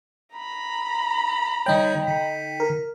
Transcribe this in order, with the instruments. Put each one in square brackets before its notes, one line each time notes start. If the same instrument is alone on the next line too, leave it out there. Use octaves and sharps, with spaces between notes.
[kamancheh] A#5 B5
[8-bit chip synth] D3 G3 C#5 [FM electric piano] D#4 G5
[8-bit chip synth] D3 B6
[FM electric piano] A#4